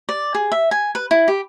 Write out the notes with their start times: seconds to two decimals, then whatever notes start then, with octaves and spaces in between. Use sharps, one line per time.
0.09 D5
0.35 G#4
0.52 E5
0.71 G#5
0.95 B4
1.11 E4
1.28 G4